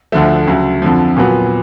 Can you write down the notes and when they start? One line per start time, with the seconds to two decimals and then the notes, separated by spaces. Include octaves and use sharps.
0.12 D2 D3 F3 A3
0.47 D2 C#3 F#3
0.82 F2 D3 F3
1.17 A#2 F#3 B3